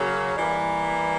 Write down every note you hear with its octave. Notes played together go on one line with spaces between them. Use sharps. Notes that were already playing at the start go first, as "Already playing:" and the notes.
Already playing: C#3 F#3 A#3
E3 G3 A#3